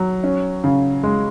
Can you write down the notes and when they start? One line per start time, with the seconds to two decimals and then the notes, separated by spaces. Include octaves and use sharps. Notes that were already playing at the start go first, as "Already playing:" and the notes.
Already playing: F#3
0.23 C#4
0.64 C#3
1.03 G#3